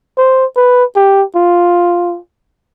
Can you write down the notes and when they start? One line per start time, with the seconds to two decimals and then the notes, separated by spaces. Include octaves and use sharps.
0.18 C5
0.57 B4
0.96 G4
1.36 F4